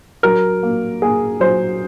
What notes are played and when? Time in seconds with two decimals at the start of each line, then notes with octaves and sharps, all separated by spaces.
0.23 F#3 A#4
0.63 A#3
1.02 A#3 G#4
1.40 F#3 C5